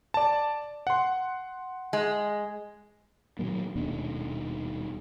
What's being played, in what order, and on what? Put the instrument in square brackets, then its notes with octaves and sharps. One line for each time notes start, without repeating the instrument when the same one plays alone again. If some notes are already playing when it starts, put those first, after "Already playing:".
[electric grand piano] D5 A5
F#5 C6
[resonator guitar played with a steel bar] G#3
[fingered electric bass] A#2 D#3 F#3 A#3
D#1 D#2 B2 D4